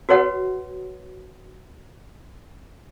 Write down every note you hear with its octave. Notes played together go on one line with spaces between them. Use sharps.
F#4 B4 C#5 F#5